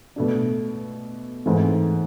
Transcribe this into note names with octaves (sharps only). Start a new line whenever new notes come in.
B2 A3 D4
G#2 E3 A3 C4